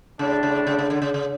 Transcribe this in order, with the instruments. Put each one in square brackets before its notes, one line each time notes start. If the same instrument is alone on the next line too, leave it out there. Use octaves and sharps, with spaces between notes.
[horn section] A2 G3 D4 [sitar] C#3
[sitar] C#3
C#3
C#3
D3
C#3
C#3